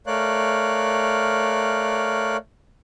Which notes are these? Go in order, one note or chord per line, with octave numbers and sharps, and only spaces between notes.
A3 A#4 C#5 D5 F5 F#6